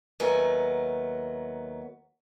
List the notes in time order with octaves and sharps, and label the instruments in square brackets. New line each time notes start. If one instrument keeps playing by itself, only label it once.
[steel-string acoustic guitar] D#2 F#3 A3 B3 A#4 G#5